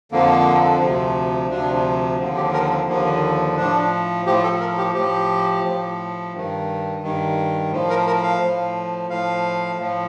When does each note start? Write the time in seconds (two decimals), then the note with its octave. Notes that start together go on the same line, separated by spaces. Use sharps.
0.12 F2 D3 F3 A#3
0.81 D2 C3 F3
1.50 D2 C3 F3 D4
2.19 D#2 D3 F3
2.37 G4
2.54 A#4
2.71 C4
2.88 D#2 D3 F3 A#3
3.57 A2 F3 D4
4.26 A2 F3 G4
4.44 A4
4.60 A#4
4.78 G4
4.95 A2 F3 G4
5.64 A2 F3
6.33 G2 D#3
7.02 G2 D#3
7.71 A2 F3
7.90 A#4
8.07 A#4
8.23 F5
8.41 A2 F3
9.10 A2 F3 F5
9.79 A2 F3